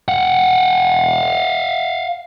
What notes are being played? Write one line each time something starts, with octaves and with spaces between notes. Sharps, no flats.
F5 F#5